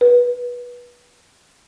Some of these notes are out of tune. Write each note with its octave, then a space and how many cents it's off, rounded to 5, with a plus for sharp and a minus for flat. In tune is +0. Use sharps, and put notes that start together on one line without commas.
B4 -20